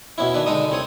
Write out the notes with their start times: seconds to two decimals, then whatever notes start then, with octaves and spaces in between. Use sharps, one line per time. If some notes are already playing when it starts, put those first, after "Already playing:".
0.18 B2 B3 C#4 E4
0.34 D#3 D4 B4
0.46 D3 G#3 D#4 A4 D#5 D#6
0.70 C2 C4 C#5 D#6